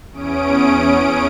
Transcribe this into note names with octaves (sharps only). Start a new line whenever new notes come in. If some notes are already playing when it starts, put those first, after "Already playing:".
E2 C#4 D#6 D7